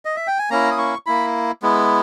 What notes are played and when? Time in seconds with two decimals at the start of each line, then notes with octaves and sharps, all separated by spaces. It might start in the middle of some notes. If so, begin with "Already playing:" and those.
0.05 D#5
0.16 E5
0.27 G5
0.38 G#5
0.50 A#3 C#4 E4 A#5
0.71 D#6
0.78 C#6
1.06 A#3 E4 B5
1.62 G#3 B3 E4